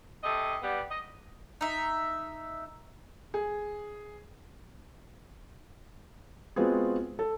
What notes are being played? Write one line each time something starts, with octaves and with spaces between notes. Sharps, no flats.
C3 A4 D#5
G3 B3
D#5
D#4 E5
G#4
G#3 B3 C4 F4 F#4 G#4
A4